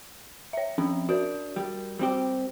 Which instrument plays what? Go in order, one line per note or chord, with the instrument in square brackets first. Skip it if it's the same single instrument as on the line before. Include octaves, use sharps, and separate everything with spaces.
[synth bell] C#5 E5
[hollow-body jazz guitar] F2 [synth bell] C#4 D4
[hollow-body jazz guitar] D4 [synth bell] F#4 A#4
[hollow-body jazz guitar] G3
G3 C4 G4